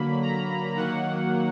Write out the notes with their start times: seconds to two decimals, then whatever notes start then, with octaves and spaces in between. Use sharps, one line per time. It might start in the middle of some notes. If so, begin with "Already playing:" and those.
Already playing: D3 F#3 A#3 B5
0.22 A#5
0.76 D#3 F#3 A#3 F#5